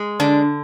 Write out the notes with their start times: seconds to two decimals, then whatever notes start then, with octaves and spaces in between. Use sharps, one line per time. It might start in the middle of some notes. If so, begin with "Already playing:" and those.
Already playing: G#3
0.20 D3 D4